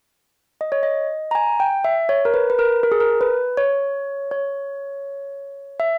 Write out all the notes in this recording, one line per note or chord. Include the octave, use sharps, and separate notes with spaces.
D#5
C#5
D#5
A#5
G#5
G5
E5
C#5
A#4
B4
B4
A#4
A#4
G#4
A#4
B4
C#5
C#5
E5